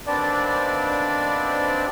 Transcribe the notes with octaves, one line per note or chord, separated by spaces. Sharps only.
D#2 B3 C4 D4 D5